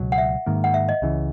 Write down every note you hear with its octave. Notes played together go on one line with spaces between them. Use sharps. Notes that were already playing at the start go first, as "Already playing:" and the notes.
Already playing: C#2 B2 F#3
F#5
E5
G#2 D#3 A#3
F#5
E5
D#5
C#2 C#3 E3